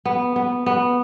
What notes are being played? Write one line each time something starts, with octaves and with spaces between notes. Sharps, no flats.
B3
B3
B3